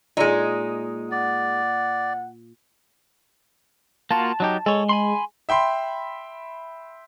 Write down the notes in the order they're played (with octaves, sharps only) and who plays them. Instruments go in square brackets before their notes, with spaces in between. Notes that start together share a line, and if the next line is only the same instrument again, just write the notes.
[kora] A#2 [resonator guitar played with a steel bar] G#3 D#4
[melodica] D5 [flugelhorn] F#5
[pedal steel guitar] A#3 F4 F#4 [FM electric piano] A5
[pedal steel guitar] F#3 D#4 G4
[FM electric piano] G#3 [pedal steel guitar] A4 C#5
[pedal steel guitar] G#5 B5 C6
[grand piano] E5 G5 B5 C6